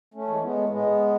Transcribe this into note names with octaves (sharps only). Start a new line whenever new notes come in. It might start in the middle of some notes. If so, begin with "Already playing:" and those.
A3 C#4
E3 G#3
G#3 B3
A2 G#3 B3